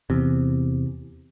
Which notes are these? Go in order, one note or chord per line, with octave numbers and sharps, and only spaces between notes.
E2 C3